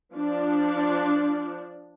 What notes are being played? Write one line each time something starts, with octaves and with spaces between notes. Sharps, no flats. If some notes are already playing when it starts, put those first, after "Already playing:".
F3 D4